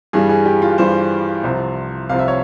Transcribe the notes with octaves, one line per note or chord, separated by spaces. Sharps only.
G2 E3 G3 G#4
G#4
G4
F4
G2 E3 G3 C5
C2 C3 F3
C2 C3 F3 F5
E5
C#5